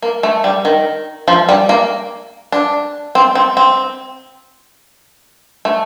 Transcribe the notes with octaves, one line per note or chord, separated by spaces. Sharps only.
A#3
A3
G3
D#3
F3
G3
A#3
D4
C4
C4
C4
A3